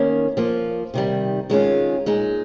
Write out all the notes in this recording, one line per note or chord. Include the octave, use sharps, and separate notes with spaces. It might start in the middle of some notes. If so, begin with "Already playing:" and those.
Already playing: D#3 A#3 C#4
F3 A#3 F4
C3 D#3 G3
D#3 G#3 C#4 F4
A#2 G#3 D#4